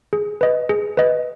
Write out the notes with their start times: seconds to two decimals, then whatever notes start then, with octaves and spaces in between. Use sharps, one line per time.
0.13 G#4
0.41 B4 D#5
0.69 G#4
0.97 B4 D#5